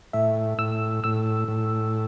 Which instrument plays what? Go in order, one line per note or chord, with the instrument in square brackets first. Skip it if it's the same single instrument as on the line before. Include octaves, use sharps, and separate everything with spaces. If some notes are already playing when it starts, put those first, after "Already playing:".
[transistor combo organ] A2 [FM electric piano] E5
[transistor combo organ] A2 [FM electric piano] E6
[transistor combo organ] A2 [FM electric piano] E6
[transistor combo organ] A2